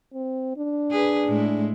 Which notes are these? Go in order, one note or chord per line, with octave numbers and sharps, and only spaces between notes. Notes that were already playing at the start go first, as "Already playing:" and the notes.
C4
D4
G#4 B4
A2 G#3 E4